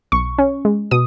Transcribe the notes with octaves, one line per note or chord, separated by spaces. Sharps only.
B1 C#6
C#4
G#3
B2 D#6